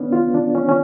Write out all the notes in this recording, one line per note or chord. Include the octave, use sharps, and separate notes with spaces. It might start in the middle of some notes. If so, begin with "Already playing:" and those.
Already playing: B3 C#4 D4
F4
D4
C#4
C#4